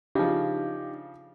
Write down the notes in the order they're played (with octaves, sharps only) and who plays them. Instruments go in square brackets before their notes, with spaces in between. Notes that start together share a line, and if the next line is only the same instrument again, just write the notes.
[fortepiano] C#3 F3 [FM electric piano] D4 D#4 [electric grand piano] G4